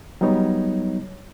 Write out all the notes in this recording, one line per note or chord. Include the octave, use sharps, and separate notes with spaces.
F#3 G3 B3 D#4 C#5